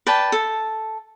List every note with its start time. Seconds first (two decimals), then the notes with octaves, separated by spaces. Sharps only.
0.07 B4 D5 G5 A5
0.32 A4